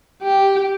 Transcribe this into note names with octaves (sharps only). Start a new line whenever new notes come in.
G4